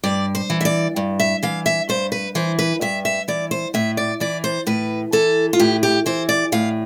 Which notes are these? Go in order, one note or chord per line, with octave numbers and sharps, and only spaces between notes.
G2 D5
C5
E3
E5
D5
G2
E5
E3 F5
E5
G2 C5
B4
E3 C5
B4
G2 E5
E5
E3 D5
C5
A2 E5
D5
E3 D5
C5
A2 B4
E3 A4
F4
A2 G4
G4
E3 C5
D5
A2 F5